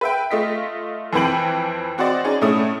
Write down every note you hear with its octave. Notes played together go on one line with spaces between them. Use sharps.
B4 E5 G5
A3 F4 D#5 B6
F2 E3 C4 B4 G5 F#7
C4 F#4 C5 D5 D#5
C#4 D#4 G#4 D5
A2 A3 C#4 D#6